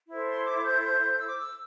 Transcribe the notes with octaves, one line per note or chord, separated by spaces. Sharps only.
E4 A4 C5
C6
D6
G6
G6
E6
D6
E6